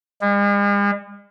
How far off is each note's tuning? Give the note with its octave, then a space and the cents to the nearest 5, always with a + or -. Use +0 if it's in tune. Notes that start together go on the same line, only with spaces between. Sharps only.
G#3 -45